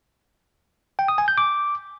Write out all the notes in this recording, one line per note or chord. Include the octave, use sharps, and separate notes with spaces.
G5
D#6
G#5
G6
D6